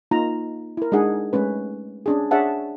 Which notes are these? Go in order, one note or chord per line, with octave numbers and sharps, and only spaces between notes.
A#3 D#4 F4 A#5
E4 A#4
G#3 D4 D#4 G#4 F#5
G#3 A3 C#4 B4
C#4 D4 G#4
D4 G#4 C#5 E5 F#5 A5